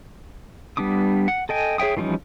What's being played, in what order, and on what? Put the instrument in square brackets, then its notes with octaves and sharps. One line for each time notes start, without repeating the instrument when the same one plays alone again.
[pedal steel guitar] G3 B3 D4 D6 D#6
F#5
A4 D#5 G5 G#5
G#4 C#5 E5 G5 D#6
E3 F3 G3 C#4 D#4